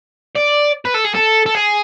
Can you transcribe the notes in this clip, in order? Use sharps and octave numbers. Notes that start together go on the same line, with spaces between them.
D5
B4
A4
G#4
A4
A4
G#4